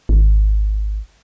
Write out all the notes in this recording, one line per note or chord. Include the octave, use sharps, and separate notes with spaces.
G#1